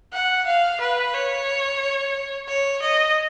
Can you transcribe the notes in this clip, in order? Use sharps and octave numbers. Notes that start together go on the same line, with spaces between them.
F#5
F5
B4
C#5
C#5
D#5